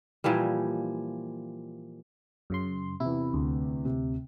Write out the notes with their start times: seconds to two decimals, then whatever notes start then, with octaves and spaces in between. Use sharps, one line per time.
0.24 A#2 E3 F3 G3
2.50 F#2 C#3 C6
3.00 E2 C3 E4
3.34 D2
3.85 C3